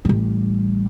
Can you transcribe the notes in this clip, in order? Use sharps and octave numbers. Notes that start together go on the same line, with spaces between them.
A1 G3